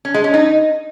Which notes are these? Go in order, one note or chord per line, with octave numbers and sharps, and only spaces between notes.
C#4
G#3
C#4
D#4